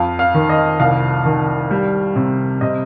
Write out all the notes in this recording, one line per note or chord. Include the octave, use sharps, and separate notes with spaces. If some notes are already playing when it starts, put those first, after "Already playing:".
Already playing: F2 F5
F5
D#3
D#5
C2 F5
D#3
G3
C3
C3 D#5